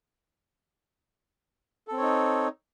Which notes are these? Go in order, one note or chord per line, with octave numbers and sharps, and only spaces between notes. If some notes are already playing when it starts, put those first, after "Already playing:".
C4 D#4 A4 C#5